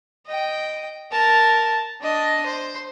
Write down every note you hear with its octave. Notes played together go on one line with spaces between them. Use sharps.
D#5 G5
A#4 A5
D4 D#5
C5